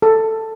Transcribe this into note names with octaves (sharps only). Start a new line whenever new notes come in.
A4